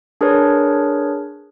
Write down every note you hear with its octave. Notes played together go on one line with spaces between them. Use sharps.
D4 G#4 A#4 B4 C#5